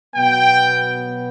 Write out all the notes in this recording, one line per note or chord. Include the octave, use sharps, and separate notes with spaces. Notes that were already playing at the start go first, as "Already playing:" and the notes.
B2 F#3 B3 G5